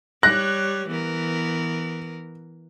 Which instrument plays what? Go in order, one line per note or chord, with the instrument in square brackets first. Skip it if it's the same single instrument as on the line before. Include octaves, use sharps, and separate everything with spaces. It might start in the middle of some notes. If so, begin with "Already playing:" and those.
[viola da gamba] G3 C#5 [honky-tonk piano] F#6 [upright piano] A#6
[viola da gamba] E3 B3 A#4